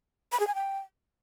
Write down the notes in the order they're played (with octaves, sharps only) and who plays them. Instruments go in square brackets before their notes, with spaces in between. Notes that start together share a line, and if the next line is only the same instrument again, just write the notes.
[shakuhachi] B5
G#4
G#5
G5